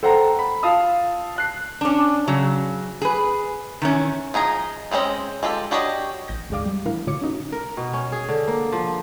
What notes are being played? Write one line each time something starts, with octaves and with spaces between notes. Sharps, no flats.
A4 C5 F#5 G5 A5 A#5
B5
F4 F5 A5 D#6 E6
A5 F#6 C7
C#4 D4
C#3 F#3
G#4 B4
D#3 E3 C#4
F3 D#4 G#4 A#5
F3 G#3 C4 C#4 D#5
G#3 F4 G4 A4
D4 F#4 G4 C#5 D#5
A1 G6 A#6
D2 G#2 G#3 D5 F5 D6
G3
A2 E3 D4 E4 A#4 F5
A2 D3 F4 C#5 D6 C#7
C#4 D#4 F#4
A#4
B2
C#4
G#4
D3
A#3
F3